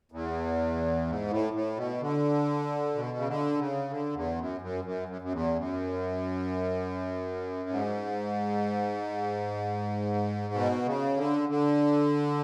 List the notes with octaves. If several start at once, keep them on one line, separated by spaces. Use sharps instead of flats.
E2
G#2
A2
A2
B2
D3
B2
C#3
D3
C#3
D3
E2
F#2
F#2
F#2
F#2
F#2
E2
F#2
G#2
B2
C#3
D3
D3